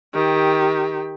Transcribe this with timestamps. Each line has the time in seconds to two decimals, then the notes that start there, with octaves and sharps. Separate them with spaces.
0.14 D#3 G4